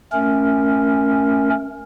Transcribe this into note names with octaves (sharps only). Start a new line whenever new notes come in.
A3 C#4 A#4